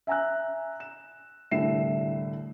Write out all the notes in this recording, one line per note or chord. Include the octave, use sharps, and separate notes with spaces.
E5 G#5 A#5 E6 F#6
E7
C2 A2 D3 E5 C7 E7